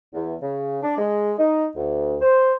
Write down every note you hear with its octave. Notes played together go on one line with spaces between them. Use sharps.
E2
C#3
D4
G#3
D#4
D2
C5